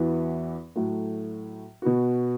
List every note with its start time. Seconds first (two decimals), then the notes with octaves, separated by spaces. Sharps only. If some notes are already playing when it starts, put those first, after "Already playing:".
Already playing: E2 E3 B3 F#4
0.76 A2 F#3 A3 F#4
1.82 B2 B3 F#4